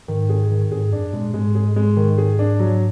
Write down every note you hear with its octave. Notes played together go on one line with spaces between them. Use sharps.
G#2 D#3
G#4
D#3
G#2 G#4
F#2 D4
A#2 G#3
G#2 G#3
G#4
G#3
D#3
G#4
D4
F#3